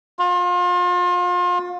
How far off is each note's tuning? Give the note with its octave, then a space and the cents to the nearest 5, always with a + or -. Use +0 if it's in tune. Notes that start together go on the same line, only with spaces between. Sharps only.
F4 +35